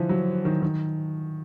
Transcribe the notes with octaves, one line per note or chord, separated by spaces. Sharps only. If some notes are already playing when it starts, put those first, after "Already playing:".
Already playing: D3 E3 F3
F#3
D#3
D#3